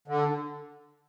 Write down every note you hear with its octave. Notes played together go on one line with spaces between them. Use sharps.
D3